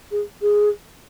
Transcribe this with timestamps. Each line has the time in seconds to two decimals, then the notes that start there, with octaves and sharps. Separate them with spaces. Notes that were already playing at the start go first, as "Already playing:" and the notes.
0.11 G#4
0.42 G#4